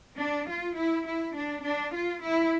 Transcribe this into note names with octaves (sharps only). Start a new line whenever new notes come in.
D4
F4
E4
E4
D4
D4
F4
E4